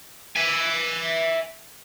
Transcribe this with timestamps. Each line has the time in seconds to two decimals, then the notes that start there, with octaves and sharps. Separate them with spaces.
0.36 E5 G#5